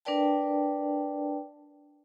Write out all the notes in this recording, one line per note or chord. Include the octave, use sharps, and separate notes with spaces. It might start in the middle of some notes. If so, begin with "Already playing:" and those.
D4 A#4 B4 D5 G5 A5